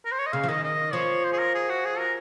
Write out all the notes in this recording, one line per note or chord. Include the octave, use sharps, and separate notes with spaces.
A#4
C5
C#5
D#5
C#3 F5
F3
D#3 D#5
D#5
F3 C#5
C5
G#4
A#4
G#4
F#4
G#4
A#4